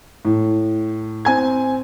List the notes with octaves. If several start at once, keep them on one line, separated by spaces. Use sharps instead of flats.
A2
C4 G#5 G#6